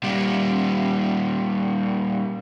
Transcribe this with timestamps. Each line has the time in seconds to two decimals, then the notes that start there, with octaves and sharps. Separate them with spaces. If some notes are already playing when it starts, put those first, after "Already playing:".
0.03 A#2 G3